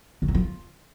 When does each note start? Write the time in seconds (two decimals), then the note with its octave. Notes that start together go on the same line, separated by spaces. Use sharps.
0.22 D#3
0.28 F#3
0.35 F4